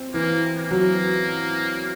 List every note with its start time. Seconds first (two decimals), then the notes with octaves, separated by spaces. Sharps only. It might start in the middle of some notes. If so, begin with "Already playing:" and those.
Already playing: C4
0.14 E3 A#3
0.57 A#3
0.71 F#3